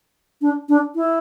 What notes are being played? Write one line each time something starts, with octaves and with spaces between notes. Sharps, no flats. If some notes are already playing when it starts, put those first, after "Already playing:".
D4
D4
E4